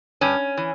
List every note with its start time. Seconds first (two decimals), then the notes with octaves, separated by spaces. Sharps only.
0.21 G2 C#4
0.57 E3